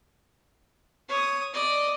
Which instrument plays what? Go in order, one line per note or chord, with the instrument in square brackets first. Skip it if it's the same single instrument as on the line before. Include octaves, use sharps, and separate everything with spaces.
[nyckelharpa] C#5 D#6
D5 D#5